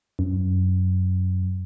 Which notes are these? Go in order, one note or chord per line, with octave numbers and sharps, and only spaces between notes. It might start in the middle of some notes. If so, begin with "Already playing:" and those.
F#2